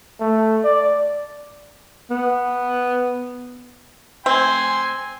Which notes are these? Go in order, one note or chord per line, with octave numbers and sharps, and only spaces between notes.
A3
D5
B3
C4 G#5 C6